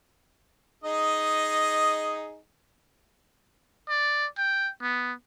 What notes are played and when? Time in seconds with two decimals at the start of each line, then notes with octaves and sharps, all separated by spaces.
0.84 D#4 G#4 D#5
3.89 D5
4.38 G5
4.82 B3